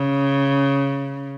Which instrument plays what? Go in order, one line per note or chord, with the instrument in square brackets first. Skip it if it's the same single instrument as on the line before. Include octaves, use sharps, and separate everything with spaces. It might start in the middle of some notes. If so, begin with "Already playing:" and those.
Already playing: [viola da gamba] C#3